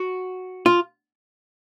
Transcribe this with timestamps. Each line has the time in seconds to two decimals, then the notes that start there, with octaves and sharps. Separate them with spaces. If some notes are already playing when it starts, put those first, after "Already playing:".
Already playing: F#4
0.66 F4